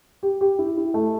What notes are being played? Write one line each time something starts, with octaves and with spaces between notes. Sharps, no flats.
G4
G4
E4
E4
A3